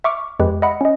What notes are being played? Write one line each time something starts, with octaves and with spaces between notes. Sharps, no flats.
E5 C#6 D6 F6
F2 G#3 G4 B4
D#5 E5 F#5 B5 C#7
C#4 D#5